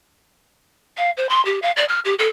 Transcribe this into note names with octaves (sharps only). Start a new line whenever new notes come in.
F5
C5
C6
G4
F5
D5
F6
G4
A4